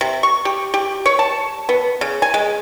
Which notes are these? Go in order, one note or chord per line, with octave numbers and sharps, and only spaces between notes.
C3
C#6
G4
G4
C#5
A5
B3
C#3
G#5
G#3